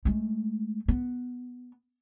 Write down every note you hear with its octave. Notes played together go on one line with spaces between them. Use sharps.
G#3 A3
B3